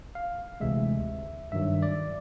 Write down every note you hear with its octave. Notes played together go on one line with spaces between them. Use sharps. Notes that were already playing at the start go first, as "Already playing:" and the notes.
F5
D2 C3 E3 G#3 E5
G2 D#3 F#3 E5
D5